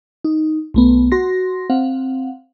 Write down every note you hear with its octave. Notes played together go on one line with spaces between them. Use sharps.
D#4
B1 A3 B3
F#4 C6 A#6
C4 F5 F#5